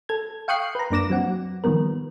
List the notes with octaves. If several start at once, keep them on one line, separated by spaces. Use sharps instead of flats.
A4 G#6
F5 G5 C#6 D#6 F#6 C7
B4 A#5
F#2 A#3 D4 D6 A#6 E7
F#3 C4 F#5
D#3 F3 G3 B3 A#4